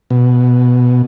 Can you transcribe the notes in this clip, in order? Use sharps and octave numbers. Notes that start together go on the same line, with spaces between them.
B2